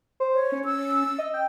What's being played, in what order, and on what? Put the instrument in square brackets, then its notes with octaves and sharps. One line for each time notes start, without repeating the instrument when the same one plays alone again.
[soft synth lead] C5
[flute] C#5
[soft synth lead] C#4
[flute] E6
[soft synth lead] D#5
G5